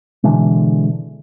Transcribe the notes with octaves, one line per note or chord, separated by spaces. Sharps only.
B2 D3 E3 G#3